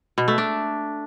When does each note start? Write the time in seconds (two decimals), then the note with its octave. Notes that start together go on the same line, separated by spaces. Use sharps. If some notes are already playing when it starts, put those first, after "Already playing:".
0.18 B2
0.28 A3
0.38 D4